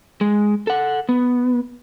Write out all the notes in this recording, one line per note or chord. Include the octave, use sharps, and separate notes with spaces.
G#3
A4 F#5
B3